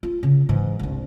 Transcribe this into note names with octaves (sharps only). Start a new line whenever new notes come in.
F4
C#3
G#2 E3
C2 D4